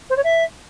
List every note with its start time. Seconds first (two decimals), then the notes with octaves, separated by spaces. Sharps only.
0.10 C5
0.17 C#5
0.24 E5